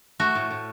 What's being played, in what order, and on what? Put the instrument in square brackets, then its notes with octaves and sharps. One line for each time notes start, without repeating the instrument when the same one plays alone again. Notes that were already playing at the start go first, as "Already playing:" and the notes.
[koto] A3 F#4
A2
A2